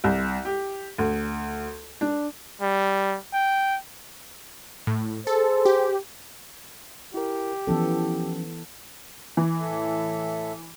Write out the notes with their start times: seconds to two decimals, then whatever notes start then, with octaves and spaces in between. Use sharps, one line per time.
0.04 C2
0.45 G4
0.98 D2
2.01 D4
2.61 G3
3.33 G5
4.87 A2
5.27 G#4 A4 C5
5.65 G4
7.14 E4 G4 A#4
7.67 E3 F3 B3 C#4 E4 A4
9.37 E3
9.60 A2 A4 E5